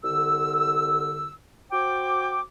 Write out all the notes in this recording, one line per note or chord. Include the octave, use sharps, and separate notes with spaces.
C2 D3 E6
F#4 C5 G5 D6